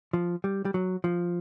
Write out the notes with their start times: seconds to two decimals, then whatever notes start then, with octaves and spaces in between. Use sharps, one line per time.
0.13 F3
0.44 G3
0.65 G3
0.74 F#3
1.04 F3